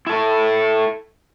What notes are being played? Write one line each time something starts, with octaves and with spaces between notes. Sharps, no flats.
E4 A4